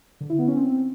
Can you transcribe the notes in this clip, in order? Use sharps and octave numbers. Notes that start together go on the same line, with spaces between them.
D3
E4
B3
C#4
C4